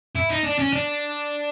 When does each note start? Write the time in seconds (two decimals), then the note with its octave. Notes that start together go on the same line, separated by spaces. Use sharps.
0.15 E4
0.30 D#4
0.44 D4
0.59 C#4
0.73 D4